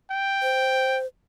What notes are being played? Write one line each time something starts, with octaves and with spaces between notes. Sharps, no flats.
G5
C5